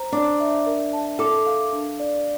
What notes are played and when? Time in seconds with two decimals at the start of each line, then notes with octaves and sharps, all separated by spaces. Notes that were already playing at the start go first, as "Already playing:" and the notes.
Already playing: C5 A#5
0.12 D4 D6
0.40 E5
0.66 A#4
0.93 A5
1.19 A4 D6
1.46 F5
1.73 D4
2.00 D5